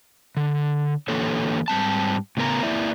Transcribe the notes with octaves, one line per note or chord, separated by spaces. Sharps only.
D3
D3 E3 A#3 G4 A4 C#5
G#2 G3 C4 A5
A2 C#3 B3 A#4 B4 A#5
A#3 E4 D5 E5